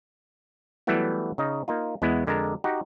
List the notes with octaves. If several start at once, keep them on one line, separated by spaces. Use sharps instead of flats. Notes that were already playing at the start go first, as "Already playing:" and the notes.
E3 F#3 G3 A3 B3 E4
C#3 D#4 D#5
A#3 D#4 F4
E2 G#3 B3 E4
F2 D3 G#3 A#4 A5 A#5
D#4 F#4 G4 F#5